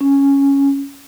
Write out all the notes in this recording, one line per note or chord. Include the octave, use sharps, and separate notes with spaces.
C#4